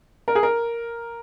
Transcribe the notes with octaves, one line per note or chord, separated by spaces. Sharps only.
A#4
G#4
A#4